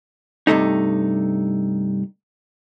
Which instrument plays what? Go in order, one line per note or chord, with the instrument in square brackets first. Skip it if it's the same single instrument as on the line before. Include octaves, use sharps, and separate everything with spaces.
[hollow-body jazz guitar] G2 C3 A3 D#4